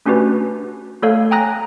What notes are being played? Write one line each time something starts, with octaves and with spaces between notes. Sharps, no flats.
A3 C#4 D4 F#4 G4 B4
A3 A4 C#5 F5
G5 G#5 A#5 D#6 F#6 A#6